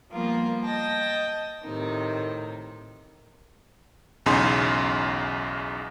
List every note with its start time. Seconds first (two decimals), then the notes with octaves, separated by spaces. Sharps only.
0.12 F3 G3 A#3 B3 F4 A#4
0.66 D#5 G5 A5 A#6
1.64 A2 C3 D#3 D#4
4.26 B1 E2 C#3 D#4 C6